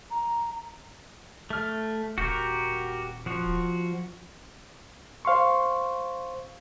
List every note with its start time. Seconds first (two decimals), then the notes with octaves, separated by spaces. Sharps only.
0.11 A#5
1.50 A3 F6
2.18 D#1 F#4 G4 A#4
3.26 F3 F#4
5.25 C5 F5 C6 C#6